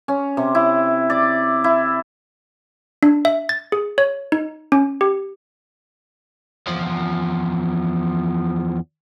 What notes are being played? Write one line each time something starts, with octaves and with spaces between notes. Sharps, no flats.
C#4
C3
E4
D5
E4
D4
E5
A6
G#4
C#5
D#4
C#4
G4
E2 F3